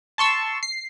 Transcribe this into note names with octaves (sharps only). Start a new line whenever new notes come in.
A5 C6 C#6 E6
C7